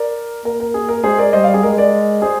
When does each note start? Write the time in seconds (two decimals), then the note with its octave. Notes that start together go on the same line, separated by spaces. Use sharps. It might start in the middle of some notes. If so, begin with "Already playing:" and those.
Already playing: A#4 D5
0.45 A#3 A#4
0.60 A#4
0.74 G#4
0.89 A#4
1.04 G#3 G#4 C5
1.18 A#4 D5
1.33 G3 C5 D#5
1.44 D5 F5
1.54 G#4
1.63 G#3 A#4
1.77 A#4 D5
2.22 G#4 C5